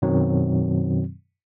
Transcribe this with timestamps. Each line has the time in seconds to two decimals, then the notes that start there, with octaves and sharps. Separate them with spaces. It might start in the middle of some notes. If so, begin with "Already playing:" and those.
0.02 F#2 B2 D#3 F#3 C4